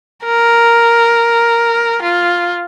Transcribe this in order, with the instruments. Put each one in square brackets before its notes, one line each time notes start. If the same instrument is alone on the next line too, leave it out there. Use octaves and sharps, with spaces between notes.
[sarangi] A#4
F4